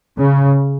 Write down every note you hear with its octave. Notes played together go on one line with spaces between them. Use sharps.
C#3